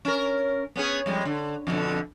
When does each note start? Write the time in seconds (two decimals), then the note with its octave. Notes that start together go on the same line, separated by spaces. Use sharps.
0.05 C#4 A#4
0.76 B3 C#4 G#4
1.06 F2 G3 G#3
1.25 D3
1.67 F2 B2 D3